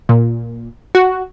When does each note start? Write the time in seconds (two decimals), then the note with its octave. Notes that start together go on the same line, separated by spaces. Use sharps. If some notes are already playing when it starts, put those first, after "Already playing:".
0.09 A#2
0.95 F#4